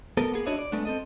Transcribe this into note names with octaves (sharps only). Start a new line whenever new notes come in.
B3 A4 A#4
A#3 B3 G#4
D4 E4 F#4 C#5 D#5
D5
G#3 A3 B3 D4
C4 A4 D#5